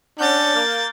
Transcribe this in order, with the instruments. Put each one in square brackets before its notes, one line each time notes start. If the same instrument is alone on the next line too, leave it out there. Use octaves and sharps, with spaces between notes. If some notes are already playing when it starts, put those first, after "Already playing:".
[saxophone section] C#4 F#5 [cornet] D4 [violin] G6 A6
[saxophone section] A#3